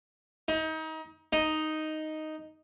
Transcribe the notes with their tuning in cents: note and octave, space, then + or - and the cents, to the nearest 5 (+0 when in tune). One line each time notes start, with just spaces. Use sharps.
D#4 +30
D#4 +0